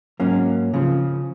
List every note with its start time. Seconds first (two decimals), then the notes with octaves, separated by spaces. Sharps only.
0.20 G#2 F#3 A#3 C#4
0.74 C#3 F3